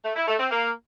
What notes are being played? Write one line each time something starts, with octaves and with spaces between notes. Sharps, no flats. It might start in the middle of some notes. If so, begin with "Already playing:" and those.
A3
E4
A3
C4
A#3